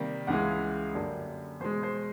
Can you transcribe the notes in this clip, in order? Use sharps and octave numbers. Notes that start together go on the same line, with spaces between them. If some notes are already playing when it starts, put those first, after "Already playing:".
Already playing: C3 D#3 G3 A#3
C#2 C#3 E3 G#3 F#5
F#2 D3 G3 A#3
E2 B2 G#3 C5
C5